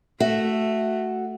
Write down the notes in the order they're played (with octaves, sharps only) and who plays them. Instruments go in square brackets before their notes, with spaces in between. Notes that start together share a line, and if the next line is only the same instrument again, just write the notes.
[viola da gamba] A3 [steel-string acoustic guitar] F#4 E5